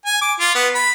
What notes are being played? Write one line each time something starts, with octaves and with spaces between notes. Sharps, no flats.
G#5
D6
F4
B3
B5